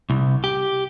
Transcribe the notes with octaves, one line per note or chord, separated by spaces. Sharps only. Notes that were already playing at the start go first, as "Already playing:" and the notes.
C2
G4